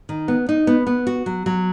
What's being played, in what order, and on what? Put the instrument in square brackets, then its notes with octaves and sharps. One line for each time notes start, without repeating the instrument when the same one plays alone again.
[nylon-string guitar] D#3
B3
D#4
B3
B3
F#4
F#3
F#3